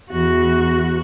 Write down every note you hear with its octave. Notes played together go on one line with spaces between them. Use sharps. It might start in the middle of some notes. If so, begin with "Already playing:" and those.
E2 F#4